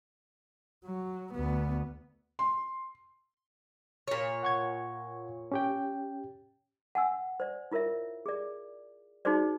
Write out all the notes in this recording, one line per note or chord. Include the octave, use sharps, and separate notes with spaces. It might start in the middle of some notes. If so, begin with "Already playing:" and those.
F#3
D2 B3
C6
A#2 C#5
F#5 C#6 G#6
C#4 G4 G5
F#5 G#5 E6
C5 D5
E4 F4 A#4 C#5 E5
G#4 D5
D#4 F#4 G#4 C5 D5